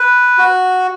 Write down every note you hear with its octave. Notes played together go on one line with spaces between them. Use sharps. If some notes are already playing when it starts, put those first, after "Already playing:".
Already playing: B4
F#4